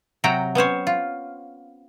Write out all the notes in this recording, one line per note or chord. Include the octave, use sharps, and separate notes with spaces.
C3 F#3 F#4 G5 A#5
B3 C#4 C5 C#5
F4